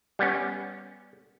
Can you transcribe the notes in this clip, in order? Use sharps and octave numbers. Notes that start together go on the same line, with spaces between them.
G3 B3 C#4